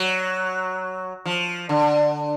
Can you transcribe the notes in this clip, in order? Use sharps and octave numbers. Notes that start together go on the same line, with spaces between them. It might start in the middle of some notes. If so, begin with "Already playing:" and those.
Already playing: F#3
F3
D3